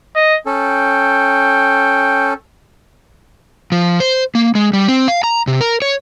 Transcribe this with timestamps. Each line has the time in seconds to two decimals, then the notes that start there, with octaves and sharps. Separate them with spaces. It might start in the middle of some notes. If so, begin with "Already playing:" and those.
0.16 D#5
0.46 C#4 A4 G5
3.72 F3
4.00 C5
4.35 A#3
4.55 G#3
4.73 G3
4.88 C4
5.08 F5
5.24 A#5
5.47 C3
5.61 A#4
5.82 C#5